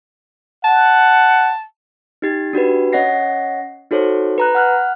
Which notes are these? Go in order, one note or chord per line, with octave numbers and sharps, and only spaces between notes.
F#5 A5
D#4 G4 A6
D4 F#4 G4 B4
C#4 C#5 D#5 F#5 A#6 C7
D#4 F#4 A4 C5 C#5
B4 A#5 F#6
F#5 F6 F#6